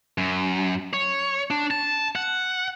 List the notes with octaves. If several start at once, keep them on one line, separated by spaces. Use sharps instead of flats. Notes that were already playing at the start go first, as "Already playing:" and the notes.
F#2
C#5
D4
A5
F#5